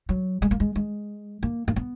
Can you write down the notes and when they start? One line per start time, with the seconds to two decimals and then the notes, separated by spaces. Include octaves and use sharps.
0.09 F#3
0.42 G#3
0.51 A#3
0.60 G#3
0.76 G#3
1.43 A#3
1.68 A#3
1.76 B3